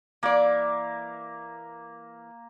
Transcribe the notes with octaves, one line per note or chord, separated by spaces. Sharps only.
E3 A#3 D5